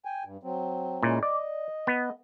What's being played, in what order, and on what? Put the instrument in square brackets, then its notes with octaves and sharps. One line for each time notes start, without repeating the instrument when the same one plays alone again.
[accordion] G5 G#5
G2
F#3 C4
[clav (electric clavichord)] A#2 [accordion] G#3 C#4 E4
[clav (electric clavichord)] D5 [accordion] D#5
[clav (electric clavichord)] B3